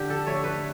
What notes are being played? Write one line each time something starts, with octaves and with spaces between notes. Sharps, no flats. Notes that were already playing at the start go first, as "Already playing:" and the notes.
Already playing: D3 G4
A4
A3 C#5
B4